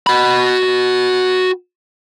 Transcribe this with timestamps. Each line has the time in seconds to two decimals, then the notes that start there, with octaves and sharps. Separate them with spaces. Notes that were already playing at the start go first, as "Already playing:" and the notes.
0.07 F#4 B5